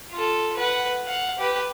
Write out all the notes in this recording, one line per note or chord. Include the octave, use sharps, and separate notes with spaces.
F4 A4
B4 F#5
F5 F#5
G4 B4